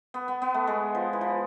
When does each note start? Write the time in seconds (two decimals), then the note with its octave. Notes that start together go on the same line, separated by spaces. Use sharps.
0.14 B3
0.28 B3
0.42 B3
0.54 A3
0.67 G#3
0.95 F3
1.13 E3
1.21 F3